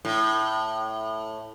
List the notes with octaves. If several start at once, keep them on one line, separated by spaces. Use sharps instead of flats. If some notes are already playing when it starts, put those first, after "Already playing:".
A2